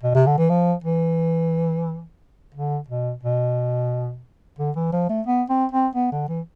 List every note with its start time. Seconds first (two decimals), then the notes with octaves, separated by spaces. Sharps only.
0.03 B2
0.15 C3
0.27 D3
0.38 E3
0.50 F3
0.84 E3
2.54 D3
2.88 B2
3.23 B2
4.59 D3
4.76 E3
4.93 F3
5.10 A3
5.27 B3
5.49 C4
5.72 C4
5.95 B3
6.12 D3
6.29 E3